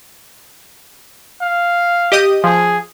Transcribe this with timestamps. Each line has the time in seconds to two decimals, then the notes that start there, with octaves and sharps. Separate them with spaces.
1.42 F5
2.12 G4 D#5 D#6
2.44 F3 G#4